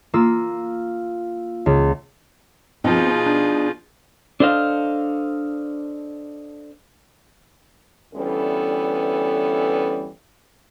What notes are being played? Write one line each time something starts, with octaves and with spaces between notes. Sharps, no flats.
A#3 F4 E6
C#2
B2 F3 C4 D#4 F4 G#4
D4
D4 A4 C5 D#5 F5
D2 E3 G3 B3 C#4 A4